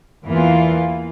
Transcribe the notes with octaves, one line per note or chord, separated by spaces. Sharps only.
E2 E3 A#3 F4